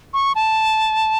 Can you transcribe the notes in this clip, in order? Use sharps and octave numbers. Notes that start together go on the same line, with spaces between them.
C#6
A5